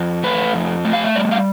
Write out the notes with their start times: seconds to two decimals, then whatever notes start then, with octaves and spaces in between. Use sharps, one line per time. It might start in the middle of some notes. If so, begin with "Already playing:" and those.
Already playing: F2
0.24 A3 B4
0.54 F2
0.85 A3
0.93 F5
1.04 E5
1.15 G3 D5
1.31 F5